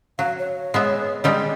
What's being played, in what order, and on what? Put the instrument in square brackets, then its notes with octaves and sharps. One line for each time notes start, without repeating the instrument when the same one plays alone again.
[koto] F#3 [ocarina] F5
[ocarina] C#5
[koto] G#3 B3 E5
D#3 G3 G#3